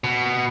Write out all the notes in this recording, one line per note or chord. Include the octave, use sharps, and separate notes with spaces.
B2